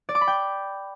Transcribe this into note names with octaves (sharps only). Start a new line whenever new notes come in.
D5
D6
B5
G5